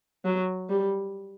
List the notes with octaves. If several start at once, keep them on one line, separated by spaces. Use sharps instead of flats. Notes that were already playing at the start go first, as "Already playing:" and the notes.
F#3
G3